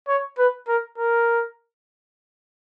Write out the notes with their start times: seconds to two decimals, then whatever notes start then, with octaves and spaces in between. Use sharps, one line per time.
0.08 C#5
0.38 B4
0.68 A#4
0.98 A#4